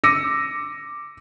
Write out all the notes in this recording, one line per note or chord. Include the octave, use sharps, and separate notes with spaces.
D6 E6 A#6 C#7 D#7